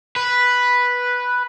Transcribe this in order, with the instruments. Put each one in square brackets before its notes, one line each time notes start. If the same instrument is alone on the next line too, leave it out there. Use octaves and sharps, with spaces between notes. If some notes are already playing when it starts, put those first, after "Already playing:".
[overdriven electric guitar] B4